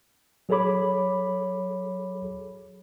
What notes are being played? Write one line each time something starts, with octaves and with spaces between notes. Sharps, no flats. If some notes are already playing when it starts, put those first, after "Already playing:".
F#3 G#4 A4 C#5 B5 D6